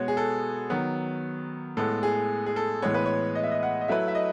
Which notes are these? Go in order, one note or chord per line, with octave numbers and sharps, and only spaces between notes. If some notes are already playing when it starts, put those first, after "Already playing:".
Already playing: B2 G#3 B3 F#4 C#5
G#4
A4
D#3 F#3 B3
A2 G#3 B3 A4
G#4
G#4
A4
A2 E3 G#3 B3 C#5
B4
C#5
D#5
E5
D#5
F#5
D#5
F#3 A3 E4 B4 E5
E5
D#5